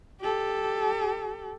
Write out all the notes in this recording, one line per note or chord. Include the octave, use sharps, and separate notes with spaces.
G4 A4